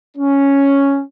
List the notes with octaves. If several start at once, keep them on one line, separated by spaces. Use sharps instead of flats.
C#4